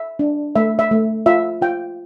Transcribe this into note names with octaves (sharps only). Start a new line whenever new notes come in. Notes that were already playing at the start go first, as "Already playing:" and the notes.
Already playing: E5
D4
A3 E5
E5
A3
F4 E5
F4 G5